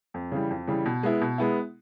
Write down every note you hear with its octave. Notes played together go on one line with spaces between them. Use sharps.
F2
C#3 E3 G3
F2
C#3 E3 G3
B2
G#3 B3 E4
B2
G#3 B3 E4